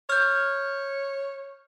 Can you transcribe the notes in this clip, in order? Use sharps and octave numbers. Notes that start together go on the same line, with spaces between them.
C#5 F6 G6